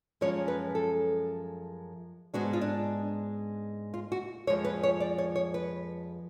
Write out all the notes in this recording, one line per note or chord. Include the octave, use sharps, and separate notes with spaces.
F#2 F3 G#3 C#4 C#5
B4
A4
G#2 G#3 B3 D4 F#4
F4
D4
F4
F#4
F2 F3 G#3 C#5
B4
C#5
D5
C#5
C#5
B4